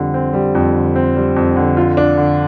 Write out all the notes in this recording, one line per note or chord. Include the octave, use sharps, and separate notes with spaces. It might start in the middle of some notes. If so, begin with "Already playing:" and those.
Already playing: F2 D3 G3 C4
C4
G3
F2
D3
C4
G3
F2
D3
F4
D4
D3